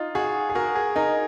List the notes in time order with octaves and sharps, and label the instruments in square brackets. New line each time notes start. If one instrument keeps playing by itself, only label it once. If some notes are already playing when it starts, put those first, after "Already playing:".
Already playing: [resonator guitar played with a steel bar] D#4 [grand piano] F4
[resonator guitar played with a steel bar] F#4 [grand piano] G#4
[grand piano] G#4
[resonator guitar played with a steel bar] F#4 [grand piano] A#4
[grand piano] G#4
[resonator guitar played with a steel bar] D#4 [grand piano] A#4